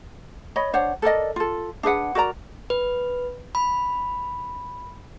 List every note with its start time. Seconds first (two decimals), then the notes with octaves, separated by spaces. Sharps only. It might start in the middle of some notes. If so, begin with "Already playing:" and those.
0.56 C#5 D#5 B5
0.74 D4 C5 C#5 F#5
1.02 A4 A#4 D5 D#5
1.36 F4 A4
1.83 D4 G#4 B4 F#5
2.15 F#4 A#4 D5 A#5
2.70 B4
3.55 B5